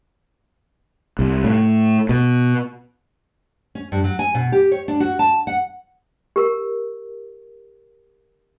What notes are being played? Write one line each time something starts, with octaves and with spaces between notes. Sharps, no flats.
C2
A2
B2
C#4
G2
F#3
G#5
B2
G4
C#5
D4
F#4
A5
F#5
G4 A#4